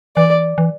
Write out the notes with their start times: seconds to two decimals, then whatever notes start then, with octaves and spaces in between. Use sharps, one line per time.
0.17 E3 D5
0.58 E3